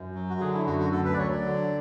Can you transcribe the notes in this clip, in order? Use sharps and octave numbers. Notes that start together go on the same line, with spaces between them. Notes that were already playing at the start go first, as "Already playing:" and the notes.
Already playing: F#2
F#3
F#4
D3 G#4
E4
F#2 F#4
F#4
D2 A4
B4
D5
F#3 C#5
D5
D3